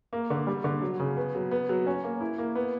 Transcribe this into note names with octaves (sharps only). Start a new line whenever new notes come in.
A#3
D3
G3
D3
F#3
C#3
B3
F#3
B3
F#3
C#4
A#3
E4
A#3
B3